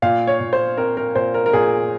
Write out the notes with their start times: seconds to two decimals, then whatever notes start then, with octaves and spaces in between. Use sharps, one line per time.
0.02 A#2 F5
0.27 C#5
0.40 A#2
0.53 C5
0.77 C4 A#4
0.97 A#4
1.15 A#2 C5
1.34 A#4
1.46 A#4
1.53 A#2 G#4